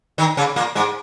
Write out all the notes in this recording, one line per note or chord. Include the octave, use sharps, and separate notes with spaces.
D#3 D#4
C#3 C#4
A#2 A#3
G#2 G#3